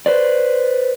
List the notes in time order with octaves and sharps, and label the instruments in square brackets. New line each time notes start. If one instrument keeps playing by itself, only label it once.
[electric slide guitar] B4 C5 D5